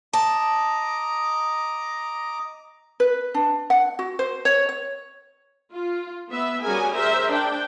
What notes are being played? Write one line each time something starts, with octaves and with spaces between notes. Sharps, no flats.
D#5 A5 A#5 D6
B4
D4
F#5
F#4
C5
C#5
C#5
F4
B3 E5
G3 C#4 F#4 G#4 A#4 G#5
G#4 A#4 C5 E5
D4 G5